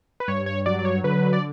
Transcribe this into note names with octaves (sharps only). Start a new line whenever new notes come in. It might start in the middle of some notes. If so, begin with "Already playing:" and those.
B4
G2 C#5
C#5
F#3 D5
D5
C#5
D3 B4
D5